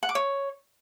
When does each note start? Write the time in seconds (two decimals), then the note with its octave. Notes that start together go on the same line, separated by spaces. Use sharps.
0.03 F#5
0.09 D6
0.15 C#5